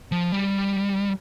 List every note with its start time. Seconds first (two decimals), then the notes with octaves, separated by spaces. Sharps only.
0.12 F3
0.32 G3